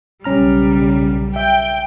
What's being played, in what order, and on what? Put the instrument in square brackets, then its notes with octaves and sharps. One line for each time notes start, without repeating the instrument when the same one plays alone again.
[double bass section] B1 C#3 [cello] G3 [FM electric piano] C#4 A#5 F6
[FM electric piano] E5 [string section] G5